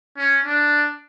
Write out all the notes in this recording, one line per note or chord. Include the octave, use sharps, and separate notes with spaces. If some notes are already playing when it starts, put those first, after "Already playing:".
C#4
D4